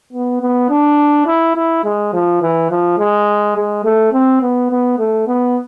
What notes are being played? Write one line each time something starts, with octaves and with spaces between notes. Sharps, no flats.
B3
B3
D4
E4
E4
G#3
F3
E3
F3
G#3
G#3
A3
C4
B3
B3
A3
B3